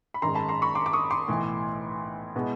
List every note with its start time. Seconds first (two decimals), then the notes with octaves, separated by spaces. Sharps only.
0.14 B5
0.22 G#1 F#2 D#3 G#3 A#5 C6
0.35 A5 B5
0.49 A#5 C6
0.62 B5 C#6
0.75 C6 D6
0.86 D6
0.93 C#6 D#6
1.11 C6 D6
1.28 B1 A2 E3
2.35 B2 G#3 B3 E4